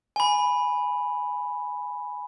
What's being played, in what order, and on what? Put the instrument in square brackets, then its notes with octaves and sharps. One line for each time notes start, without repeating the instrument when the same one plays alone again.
[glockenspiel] G#5 B5